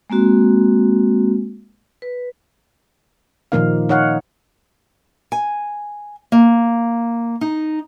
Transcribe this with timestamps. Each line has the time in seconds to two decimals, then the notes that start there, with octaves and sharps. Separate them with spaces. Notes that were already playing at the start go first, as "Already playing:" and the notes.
0.10 G#3 A#3 C4 F#4
2.02 B4
3.52 A#2 D#3 F3 A#3 D#4 F5
3.89 D#4 C#5 F5 F#5
5.32 G#5
6.32 A#3
7.41 D#4